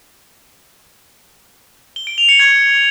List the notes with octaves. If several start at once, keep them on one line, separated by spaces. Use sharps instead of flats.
G7
D7
F7
C#7
G#6